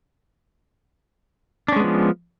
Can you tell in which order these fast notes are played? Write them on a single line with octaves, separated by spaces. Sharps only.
D4 C#4 G#3 B3 F3